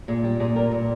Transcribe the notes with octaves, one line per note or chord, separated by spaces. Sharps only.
A#2 G#4
G3
A#2 G#4
G3 A#4
A#2